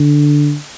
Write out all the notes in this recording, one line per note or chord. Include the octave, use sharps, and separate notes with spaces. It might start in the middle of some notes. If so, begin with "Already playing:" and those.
Already playing: D3